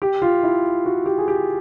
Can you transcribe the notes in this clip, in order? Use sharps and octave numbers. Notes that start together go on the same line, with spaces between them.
G4
F4
E4
F#4
G4
G#4
G4